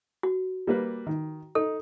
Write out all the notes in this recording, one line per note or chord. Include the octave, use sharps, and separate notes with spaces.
F#4
G3 A#3 B4
D#3
D#4 A4